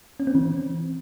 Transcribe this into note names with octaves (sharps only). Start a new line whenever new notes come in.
C#4
C4
E3